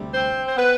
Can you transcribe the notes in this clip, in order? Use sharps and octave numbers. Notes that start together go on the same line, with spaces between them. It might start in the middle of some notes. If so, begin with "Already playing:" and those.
Already playing: D2 C3 G3
C4 C5
C5
B3 B4